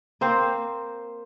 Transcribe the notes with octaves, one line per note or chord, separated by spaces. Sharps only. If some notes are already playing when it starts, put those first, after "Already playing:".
A#3 C4 C5